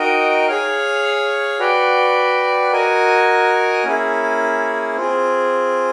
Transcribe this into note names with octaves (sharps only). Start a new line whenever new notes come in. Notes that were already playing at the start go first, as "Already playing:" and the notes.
Already playing: D#4 F#4 A#4 D#5 G5
G#4 C#5 F5
F#4 B4 D5 G5
F#4 A#4 D#5 G#5
A#3 C#4 E4 G#4
C4 F4 G#4